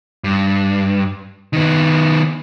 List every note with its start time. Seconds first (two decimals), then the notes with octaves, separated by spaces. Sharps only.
0.24 G2
1.53 D#3 B3